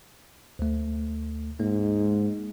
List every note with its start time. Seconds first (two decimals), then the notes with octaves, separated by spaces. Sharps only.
0.59 D2 A3
1.60 G#2 A#3